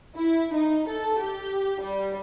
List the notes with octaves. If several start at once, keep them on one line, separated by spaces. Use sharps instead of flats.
E4
D#4
A4
G4
G3